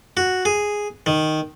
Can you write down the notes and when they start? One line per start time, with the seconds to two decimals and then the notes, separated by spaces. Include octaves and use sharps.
0.17 F#4
0.45 G#4
1.06 D#3